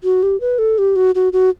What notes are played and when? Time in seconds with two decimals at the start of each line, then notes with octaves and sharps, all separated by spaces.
0.04 F#4
0.23 G4
0.41 B4
0.59 A4
0.78 G4
0.96 F#4
1.15 F#4
1.33 F#4